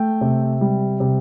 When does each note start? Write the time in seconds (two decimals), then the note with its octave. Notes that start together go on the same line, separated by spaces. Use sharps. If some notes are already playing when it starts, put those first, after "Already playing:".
Already playing: A3 G5
0.21 C3
0.61 G3
1.00 C3